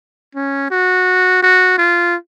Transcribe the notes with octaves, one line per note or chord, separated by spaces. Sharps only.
C#4
F#4
F#4
F4